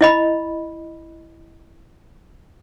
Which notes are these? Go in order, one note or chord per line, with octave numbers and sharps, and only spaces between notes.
E4 D#5 B5